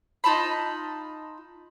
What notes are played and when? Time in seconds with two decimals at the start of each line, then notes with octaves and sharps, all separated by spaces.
0.24 D#4 F4 A5 B5